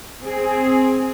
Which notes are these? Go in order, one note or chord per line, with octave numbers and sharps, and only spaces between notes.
C4 G#4